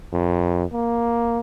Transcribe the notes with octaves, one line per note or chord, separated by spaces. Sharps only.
F2
A#3